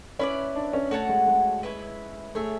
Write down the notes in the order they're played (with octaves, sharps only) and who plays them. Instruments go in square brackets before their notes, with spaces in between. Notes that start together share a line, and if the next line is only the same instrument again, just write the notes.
[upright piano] C#4 [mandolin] E4 B4 D5
[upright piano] D4
C#4
[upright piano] A3 [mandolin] F#4 C#5 F#5 A5
[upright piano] G#3
G#3
[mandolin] C#4 E4 B4
[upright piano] A3 [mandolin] G#4 C#5 E5